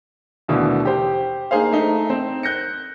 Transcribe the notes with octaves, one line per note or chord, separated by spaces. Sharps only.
D#2 B2 D3 E3 A3
G4 C5
A#3 D#4 G#4 C5 F5
A3 D#4
C4
F#6 G6 A#6 C#7